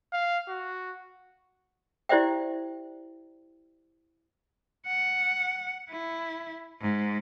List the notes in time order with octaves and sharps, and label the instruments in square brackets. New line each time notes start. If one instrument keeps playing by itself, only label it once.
[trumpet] F5
F#4
[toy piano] E4 G4 C5 D5 E5 G5
[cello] F#5
E4
G#2